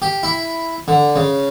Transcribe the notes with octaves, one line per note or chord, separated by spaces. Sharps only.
G4
E4
D3
C#3